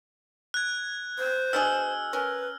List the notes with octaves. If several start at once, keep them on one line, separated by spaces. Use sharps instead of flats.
F#6 G#6
C5
B2 D4 G#4 E6 F6
C#4 A#4 B4